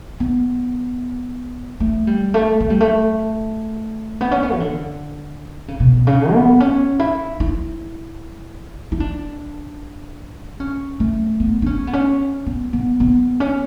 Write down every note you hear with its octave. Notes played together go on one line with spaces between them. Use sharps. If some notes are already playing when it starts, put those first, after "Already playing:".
B3
A3
G3
A3
A3
G3
A3
B3
C#4
B3
E3
D3
C#3
B2
C#3
B3
C#4
E4
E4
E4
D4
C#4
A3
B3
D4
C#4
B3
C#4
B3
B3
B3
C#4